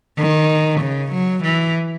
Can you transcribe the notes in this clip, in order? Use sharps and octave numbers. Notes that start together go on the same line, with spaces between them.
D#3
C#3
F#3
E3